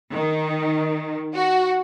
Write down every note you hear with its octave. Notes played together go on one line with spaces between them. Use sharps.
D#3
F#4